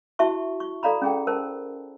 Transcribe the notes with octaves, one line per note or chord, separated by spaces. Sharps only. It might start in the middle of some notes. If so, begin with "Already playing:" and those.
E4 F#4 E5 A5 C#6
C#6
A4 D5 F5 A#5 B5
C#4 G#4 G5
A#4 C5 A5